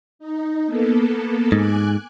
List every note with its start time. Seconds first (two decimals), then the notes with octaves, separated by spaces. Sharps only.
0.19 D#4
0.67 A#3 B3 A4
1.52 G#2 G#5 D6 F#6